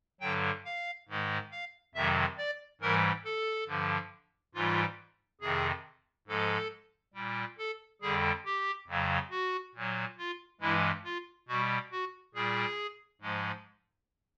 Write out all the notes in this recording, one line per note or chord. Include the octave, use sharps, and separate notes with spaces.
G2 D3 F#3 G5
F5
G#2 D#3 G#3
F5
F2 C3 D#3 F#3 E5
D5
G#2 E3 G3 A#4
A4
G2 D3 F3
G#2 E3 G3 F4
F2 C3 D#3 G#4
G#2 F3 G#3 A4
A#2 G3
A4
F2 D3 G3 G#4
G4
F2 C#3 F#3
F#4
A#2 F#3
F4
G2 E3 G#3 E4
F4
B2 G3 F#4
F#4
A#2 G3 G#4
G#2 F3 G#3